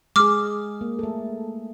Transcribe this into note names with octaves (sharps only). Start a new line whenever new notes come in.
G#3 G#4 D6 F6
A#3
A3 A4